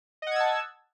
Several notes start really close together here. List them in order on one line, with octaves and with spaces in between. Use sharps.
D#5 F#5 G#6 E6 A5